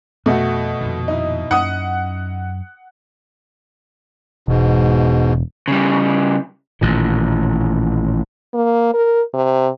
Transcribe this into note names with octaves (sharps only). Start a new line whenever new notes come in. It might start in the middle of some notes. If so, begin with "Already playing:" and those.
F2 B2 A3 F#4
F2 A#2 D#3
D#4 E4
F#2 C#4 F#5 D#6
E1 G#2 B2
C#3 G3
A1 A#2 D#3
A#3
A#4
C3